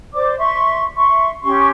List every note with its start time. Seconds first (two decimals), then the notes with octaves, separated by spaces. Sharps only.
0.14 C5 D5 D6
0.38 E5 C6 C#6
0.95 E5 C6 C#6
1.42 C#4 G4 C6 C#6